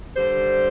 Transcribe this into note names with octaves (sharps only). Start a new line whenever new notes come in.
D3 G3 C5